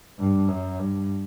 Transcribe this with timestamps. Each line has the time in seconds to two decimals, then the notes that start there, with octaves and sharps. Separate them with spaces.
0.19 G2
0.49 F#2
0.79 G2